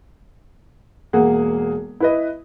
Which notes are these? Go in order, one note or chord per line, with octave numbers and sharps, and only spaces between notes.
E1 A#3 G#4 F#5
E4 B4 D#5